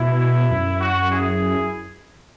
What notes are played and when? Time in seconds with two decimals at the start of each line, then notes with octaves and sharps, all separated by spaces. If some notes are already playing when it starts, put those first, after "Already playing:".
Already playing: B2 E4
0.51 F#2
0.80 F#4
1.09 E4 G#4